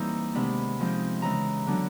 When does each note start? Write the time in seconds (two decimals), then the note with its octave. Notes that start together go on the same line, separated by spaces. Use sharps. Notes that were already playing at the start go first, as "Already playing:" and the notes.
Already playing: E3 G3 A#3 C4 D#4 A#5
0.35 C3 D#3 G#3 B3 D4 B5
0.79 F3 G#3 C4 D#4
1.22 C#3 E3 G#3 A#5
1.66 D3 F#3 B3 D4